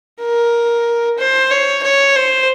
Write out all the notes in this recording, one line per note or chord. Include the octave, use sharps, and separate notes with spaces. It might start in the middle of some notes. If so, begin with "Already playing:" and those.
A#4
C5
C#5
C#5
C5